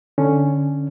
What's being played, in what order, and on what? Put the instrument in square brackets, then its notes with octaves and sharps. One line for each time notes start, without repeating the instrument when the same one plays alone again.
[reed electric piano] D3 C#4